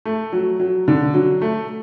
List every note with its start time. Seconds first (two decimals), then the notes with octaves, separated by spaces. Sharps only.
0.05 A3
0.33 F#3
0.60 F#3
0.88 D3
1.14 F#3
1.41 A3